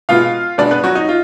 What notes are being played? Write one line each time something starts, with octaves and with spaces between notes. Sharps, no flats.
B2 G#3 B3 F4 F5
B2 G#3 B3 D4 D5
B3 B4
F#3 F#4
D#4
F4